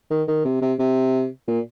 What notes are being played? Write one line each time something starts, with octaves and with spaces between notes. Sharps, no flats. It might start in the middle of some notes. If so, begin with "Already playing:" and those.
D#3
D#3
C3
C3
C3
A#2